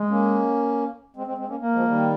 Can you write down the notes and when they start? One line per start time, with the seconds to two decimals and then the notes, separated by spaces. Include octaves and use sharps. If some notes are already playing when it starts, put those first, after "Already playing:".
Already playing: G#3
0.10 A#3 C#4
1.16 G#3 C4
1.27 G#3 C4
1.37 G#3 C4
1.48 A#3 C#4
1.59 A#3
1.73 F3 G#3
1.87 D#3 G3